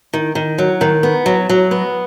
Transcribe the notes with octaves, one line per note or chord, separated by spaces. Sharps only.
D#3
D#3
F#3
D#3
B3
F#3
F#3
B3